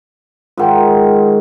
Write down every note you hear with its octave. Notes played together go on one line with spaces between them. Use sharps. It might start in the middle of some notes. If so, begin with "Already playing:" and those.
G#2 D#3 F4 F#5 G5